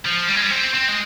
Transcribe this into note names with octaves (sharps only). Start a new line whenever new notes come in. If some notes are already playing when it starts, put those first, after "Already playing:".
F3
G3
G#3
G3
C4
C4
G#3